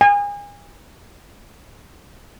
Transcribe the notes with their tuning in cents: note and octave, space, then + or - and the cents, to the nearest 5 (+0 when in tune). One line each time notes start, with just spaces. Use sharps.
G#5 -35